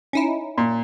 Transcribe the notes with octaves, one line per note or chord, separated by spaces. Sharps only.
C#4 D#4 E4
A#2